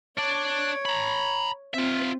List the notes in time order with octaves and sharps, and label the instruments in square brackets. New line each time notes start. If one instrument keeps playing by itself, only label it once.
[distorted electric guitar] D4 D5 [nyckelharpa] C#5
[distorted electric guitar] A#5 B5
[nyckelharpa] C4 [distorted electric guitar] F4 E5